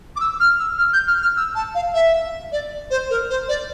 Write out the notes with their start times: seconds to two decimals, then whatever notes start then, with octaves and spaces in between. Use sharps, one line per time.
0.16 D6
0.20 E6
0.40 F6
0.59 E6
0.78 F6
0.93 G6
1.08 F6
1.22 F6
1.36 E6
1.55 A5
1.74 F5
1.94 E5
2.52 D5
2.90 C5
3.10 A#4
3.30 C5
3.48 D5